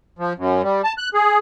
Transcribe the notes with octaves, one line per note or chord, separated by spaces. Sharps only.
F3
F#2
G3
A5
F#6
G#4